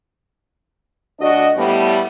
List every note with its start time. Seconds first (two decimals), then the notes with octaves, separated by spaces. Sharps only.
1.20 D2 D4 F#4 D#5
1.57 A2 G3 B3